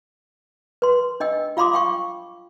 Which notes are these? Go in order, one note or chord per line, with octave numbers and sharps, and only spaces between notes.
B4 C6
D4 D#5 G5 E6
F4 F5 B5 C6 D6 D#6
F5 G5 C#6